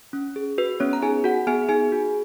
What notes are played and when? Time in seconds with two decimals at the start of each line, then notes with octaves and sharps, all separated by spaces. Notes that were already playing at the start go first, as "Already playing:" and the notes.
0.13 C#4
0.36 G#4
0.58 F#4 B4
0.80 B3 C#4 C#5
0.93 A#5
1.02 D#4 G#4 G#5
1.24 F#4 G#4 F#5
1.47 B3 G#4 G#5
1.69 D#4 G#4 G#5
1.92 F#4